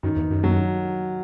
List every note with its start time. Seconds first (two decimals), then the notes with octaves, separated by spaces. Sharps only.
0.03 F#2 D#3
0.17 E2
0.30 F#2
0.44 F#3